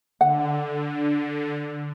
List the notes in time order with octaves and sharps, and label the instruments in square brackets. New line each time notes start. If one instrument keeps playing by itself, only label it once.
[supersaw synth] D3 [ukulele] F#5